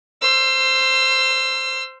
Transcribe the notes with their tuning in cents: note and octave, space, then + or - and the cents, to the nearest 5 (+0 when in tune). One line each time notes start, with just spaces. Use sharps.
C5 +0 E6 +35